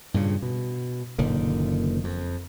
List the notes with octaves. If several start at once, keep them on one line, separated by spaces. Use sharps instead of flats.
G2 A#2 C#3
B2
F#1 A#2 D3 D#3
F2